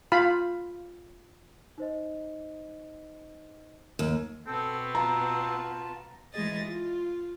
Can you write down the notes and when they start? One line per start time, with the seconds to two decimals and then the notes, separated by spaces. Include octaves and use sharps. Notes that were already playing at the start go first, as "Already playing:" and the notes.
0.12 F4 F5 B5
1.78 D#4 C5 D#5
3.99 D#2
4.47 B2 B3 C4 A4
4.95 F4 A5 A#5
6.33 E3 G#3 G#4 D#5 A6
6.65 F4